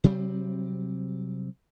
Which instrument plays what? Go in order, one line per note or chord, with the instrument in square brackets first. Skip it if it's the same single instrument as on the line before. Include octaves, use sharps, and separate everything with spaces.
[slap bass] C3 F#3 G3 C4